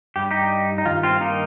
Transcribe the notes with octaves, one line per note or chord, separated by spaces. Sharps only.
G2 G3 G4
D#4 G4
D#4
G2 D#3 F4
C4 F4
A#3 D#4